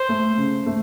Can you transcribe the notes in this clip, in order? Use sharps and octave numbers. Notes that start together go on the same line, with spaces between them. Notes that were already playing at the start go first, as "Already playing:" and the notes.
Already playing: C5
A3
C#3
A3